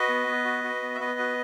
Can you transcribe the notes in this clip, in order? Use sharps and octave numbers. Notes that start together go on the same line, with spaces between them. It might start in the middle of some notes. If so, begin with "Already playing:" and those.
Already playing: F#4 B4 D#5
B3
B3
F#4
F#4
B3
E5
B3 B4 D#5
F#4